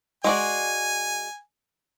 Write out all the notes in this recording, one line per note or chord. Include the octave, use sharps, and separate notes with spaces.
G#3 F#4 D5 G#5